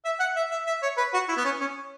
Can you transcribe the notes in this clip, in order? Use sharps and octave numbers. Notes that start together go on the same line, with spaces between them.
E5
F#5
E5
E5
E5
C#5
B4
F#4
E4
B3
C#4
C#4